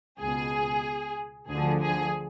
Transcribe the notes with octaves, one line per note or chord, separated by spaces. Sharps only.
C#2 B2 G#4
D2 D3 F3 G#4
G#4